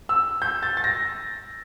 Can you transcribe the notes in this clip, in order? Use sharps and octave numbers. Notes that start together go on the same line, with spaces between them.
E6
G6
A6
A6
A#6